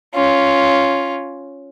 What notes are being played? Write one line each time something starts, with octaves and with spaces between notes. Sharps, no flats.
C#4 F4